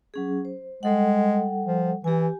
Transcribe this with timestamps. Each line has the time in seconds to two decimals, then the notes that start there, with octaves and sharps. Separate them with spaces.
0.14 F#3 C#4 G#4
0.45 C5
0.83 G3 G#3 A4 F#5
1.66 F3
2.04 E3 G4 G#5